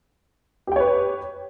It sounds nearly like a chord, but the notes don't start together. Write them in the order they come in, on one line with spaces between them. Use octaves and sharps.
G4 G5 C#5 B4